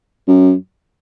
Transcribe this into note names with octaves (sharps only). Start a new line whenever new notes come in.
F#2